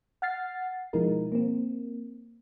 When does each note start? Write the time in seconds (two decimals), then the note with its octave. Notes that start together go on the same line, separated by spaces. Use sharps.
0.22 F#5 F6 A6 C7
0.93 B2 F3 G#3 D#4 E4 A#4
1.32 A#3 C4